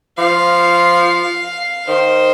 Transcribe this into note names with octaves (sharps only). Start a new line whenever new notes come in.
F3 F5
D#3 C5